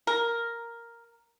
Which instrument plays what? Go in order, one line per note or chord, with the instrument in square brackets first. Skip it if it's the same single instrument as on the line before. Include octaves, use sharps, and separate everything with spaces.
[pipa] A#4